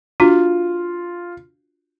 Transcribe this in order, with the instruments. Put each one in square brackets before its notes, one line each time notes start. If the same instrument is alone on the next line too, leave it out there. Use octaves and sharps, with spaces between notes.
[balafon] D4 F#4 [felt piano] F4